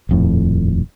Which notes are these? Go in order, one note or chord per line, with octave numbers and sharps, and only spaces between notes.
D#1 F2 A2